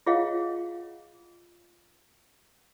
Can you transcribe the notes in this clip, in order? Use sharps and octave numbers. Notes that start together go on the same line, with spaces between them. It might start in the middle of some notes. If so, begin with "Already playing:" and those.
F4 G#4 C#5 D#5 F5 F#5